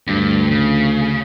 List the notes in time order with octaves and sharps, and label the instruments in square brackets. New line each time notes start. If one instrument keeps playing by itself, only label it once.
[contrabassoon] D2 [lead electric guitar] G2
[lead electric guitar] C#3